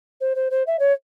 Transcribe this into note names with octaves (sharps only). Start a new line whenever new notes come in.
C5
C5
C5
E5
C#5